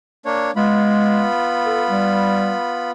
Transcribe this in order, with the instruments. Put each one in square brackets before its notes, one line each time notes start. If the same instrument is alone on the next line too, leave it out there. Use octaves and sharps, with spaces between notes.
[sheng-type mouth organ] A#3 D4 C#5
[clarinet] G#3 [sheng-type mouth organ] B3 F4 B5
[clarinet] A4
G3